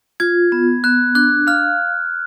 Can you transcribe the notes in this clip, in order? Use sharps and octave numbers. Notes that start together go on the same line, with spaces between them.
F4 G#6
B3
B3 F#6
D4 F#6
F5 F6